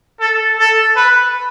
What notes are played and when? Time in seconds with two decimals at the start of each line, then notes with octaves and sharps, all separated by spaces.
0.20 A4
0.59 A4
0.96 B4